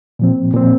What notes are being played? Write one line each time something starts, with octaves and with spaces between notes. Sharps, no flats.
A#2 F3 C4
A#2 F3 C4